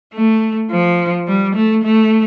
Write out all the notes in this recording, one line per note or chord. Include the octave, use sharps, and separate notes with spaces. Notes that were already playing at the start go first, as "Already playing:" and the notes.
A3
F3
G3
A3
A3